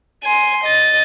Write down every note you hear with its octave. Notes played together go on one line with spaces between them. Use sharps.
G#5 C6
D#5 A6